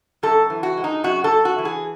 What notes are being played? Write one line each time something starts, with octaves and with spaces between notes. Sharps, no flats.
F#2 A4
E3
F#4
G#3
D#4
F#2 F#4
A4
F#2
F#4
E3
G#4